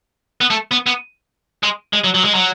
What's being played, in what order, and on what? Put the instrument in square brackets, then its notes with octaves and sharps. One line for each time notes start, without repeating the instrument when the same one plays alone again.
[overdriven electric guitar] B3
A3
B3
B3
G#3
G#3
F#3
F#3
G#3
F#3